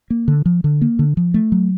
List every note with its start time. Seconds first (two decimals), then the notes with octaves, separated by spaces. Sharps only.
0.10 A#3
0.28 D3
0.46 F3
0.64 D3
0.82 A#3
0.99 D3
1.17 F3
1.34 A3
1.52 F#3